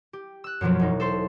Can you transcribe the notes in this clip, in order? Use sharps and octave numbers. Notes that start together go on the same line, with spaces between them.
G4
E6 F#6
F#2 B2 F3 F#3
E1 D#4
A4 C5 C6